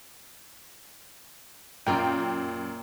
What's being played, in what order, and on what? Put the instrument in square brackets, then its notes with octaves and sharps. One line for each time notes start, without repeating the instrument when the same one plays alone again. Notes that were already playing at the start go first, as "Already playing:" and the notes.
[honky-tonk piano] F#2 G5 [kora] A#2 A#3 F4